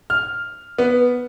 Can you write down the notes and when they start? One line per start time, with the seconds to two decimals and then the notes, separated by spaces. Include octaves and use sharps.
0.10 F6
0.79 B3